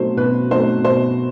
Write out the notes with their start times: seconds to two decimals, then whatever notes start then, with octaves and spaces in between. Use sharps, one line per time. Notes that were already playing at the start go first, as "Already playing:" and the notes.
Already playing: B2 F#3 A3 C4 D#4 C5
0.17 B2 B4
0.51 F#3 A3 C4 D#4 C5
0.84 B2 C5